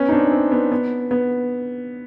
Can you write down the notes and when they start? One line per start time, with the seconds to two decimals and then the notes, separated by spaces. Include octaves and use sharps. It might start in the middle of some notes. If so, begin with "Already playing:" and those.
Already playing: B3 C#4
0.09 D#4
0.12 C4 D4
0.24 C#4
0.32 C4
0.52 B3
0.72 B3
1.11 B3